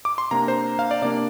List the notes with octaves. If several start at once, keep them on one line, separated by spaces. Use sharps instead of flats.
D6
C6
C3 A#3 D4 A#5
C5
F5
D5
C3 A#3 D4 D5